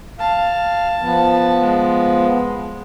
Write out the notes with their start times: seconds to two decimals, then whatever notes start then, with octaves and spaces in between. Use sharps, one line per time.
0.19 F5 A5
1.01 F3 B3
1.62 G#3